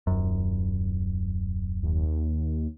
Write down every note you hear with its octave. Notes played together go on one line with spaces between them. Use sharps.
D#1 F#2
D#2